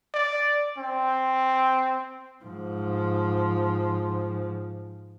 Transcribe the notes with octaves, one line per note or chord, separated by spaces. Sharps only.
D5
C4
G#2 F3